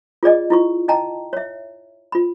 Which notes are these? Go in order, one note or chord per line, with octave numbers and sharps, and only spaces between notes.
F4 G#4 D5 D#5
E4 F4 C#6
D#5 G5 A5 A#5
C#5 E5
F4 B5